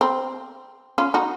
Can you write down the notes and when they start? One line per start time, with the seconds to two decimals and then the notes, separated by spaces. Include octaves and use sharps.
0.01 C4
0.98 C#4 F4
1.14 D#4 F#4